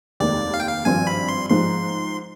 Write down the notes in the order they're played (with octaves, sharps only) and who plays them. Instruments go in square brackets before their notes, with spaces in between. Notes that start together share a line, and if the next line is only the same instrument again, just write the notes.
[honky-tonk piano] F1 D#2 D#3 G#3 [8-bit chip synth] D5
[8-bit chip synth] F5
G5
F5
[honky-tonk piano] G#1 G2 F3 C4 [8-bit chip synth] G#5
[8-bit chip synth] B5
C6
[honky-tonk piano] G#2 F3 G#3 [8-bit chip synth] C6